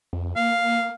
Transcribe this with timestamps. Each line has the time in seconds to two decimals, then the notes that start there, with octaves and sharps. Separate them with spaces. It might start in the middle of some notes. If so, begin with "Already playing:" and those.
0.13 F2
0.36 A#3 F5